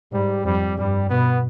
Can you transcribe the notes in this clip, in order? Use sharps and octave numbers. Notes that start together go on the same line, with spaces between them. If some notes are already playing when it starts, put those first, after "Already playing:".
G#2 G3
F2 G3
G2 G3
B2 B3